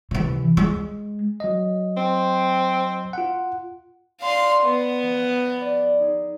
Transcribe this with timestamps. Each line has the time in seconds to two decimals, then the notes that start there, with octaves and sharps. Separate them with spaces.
0.11 C3 E3
0.57 G#3
1.40 F#3 D#5
1.97 C4
3.13 F4 F#5
4.21 D5 F5 C6 G6
4.63 B3
5.02 F3
5.61 D5
6.00 D#4 G#4